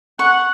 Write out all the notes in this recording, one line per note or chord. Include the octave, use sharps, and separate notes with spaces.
F#5 C#6